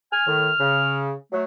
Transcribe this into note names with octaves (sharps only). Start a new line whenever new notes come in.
G#5 F6
A2 D#3
C#3
F#3 A3